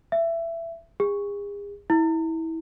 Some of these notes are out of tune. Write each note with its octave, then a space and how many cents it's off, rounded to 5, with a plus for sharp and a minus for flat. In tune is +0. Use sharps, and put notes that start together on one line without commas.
E5 +20
G#4 -40
E4 -25